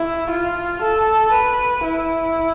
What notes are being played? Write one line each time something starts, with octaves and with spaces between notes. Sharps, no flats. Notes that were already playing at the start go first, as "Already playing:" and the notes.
Already playing: E4
F4
A4
B4
E4